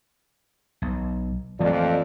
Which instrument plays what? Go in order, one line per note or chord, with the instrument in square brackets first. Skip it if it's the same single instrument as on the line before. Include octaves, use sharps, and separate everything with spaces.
[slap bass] B1
[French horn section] F2 F4 D5 [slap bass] E3 A3 A#3